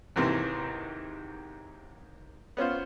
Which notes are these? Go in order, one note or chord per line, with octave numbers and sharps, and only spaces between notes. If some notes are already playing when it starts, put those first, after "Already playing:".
D#2 G#2 C3 D#3 E3
B3 C#4 F4 C5